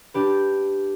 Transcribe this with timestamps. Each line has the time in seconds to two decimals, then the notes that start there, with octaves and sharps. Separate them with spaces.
0.14 D4 G4 B4